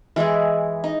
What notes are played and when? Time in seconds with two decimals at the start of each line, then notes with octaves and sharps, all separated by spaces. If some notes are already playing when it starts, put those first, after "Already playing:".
0.16 E3 G#3 E4 G#4
0.84 D#4